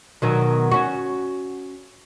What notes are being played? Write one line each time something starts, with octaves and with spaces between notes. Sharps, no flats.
B2 D#3 F#3
C#4 F#4